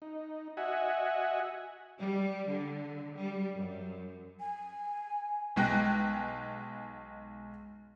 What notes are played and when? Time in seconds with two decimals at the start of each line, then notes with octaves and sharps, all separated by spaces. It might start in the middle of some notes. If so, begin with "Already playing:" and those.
0.02 D#4
0.57 F#4 D#5 E5 F#5 G#5
1.98 G3
2.50 D3
3.13 G3
3.55 F#2
4.40 G#5
5.56 B1 G#3 G5 F#6 A#6